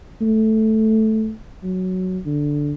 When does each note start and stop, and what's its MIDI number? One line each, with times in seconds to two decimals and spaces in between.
0.21 1.33 57
1.63 2.18 54
2.26 2.73 50